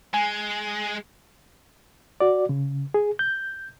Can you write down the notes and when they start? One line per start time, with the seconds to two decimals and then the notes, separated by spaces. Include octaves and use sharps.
0.14 G#3 G#5
2.20 F#4 D5
2.49 C#3
2.94 G#4
3.19 G6